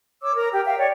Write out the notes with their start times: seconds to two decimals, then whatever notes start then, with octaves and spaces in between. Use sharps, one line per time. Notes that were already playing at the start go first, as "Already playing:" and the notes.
0.22 C#5 D6 E6
0.35 A#4 A#5
0.51 G4 G5
0.65 E5 F5 G5
0.79 C#5 D5